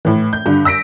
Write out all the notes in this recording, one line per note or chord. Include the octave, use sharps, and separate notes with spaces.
A2 E3
G6
G2 D3
E6 A#6 B6 D7